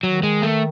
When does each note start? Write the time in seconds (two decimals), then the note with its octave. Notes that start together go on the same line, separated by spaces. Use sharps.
0.03 D#3 F#3
0.23 G#3
0.42 A3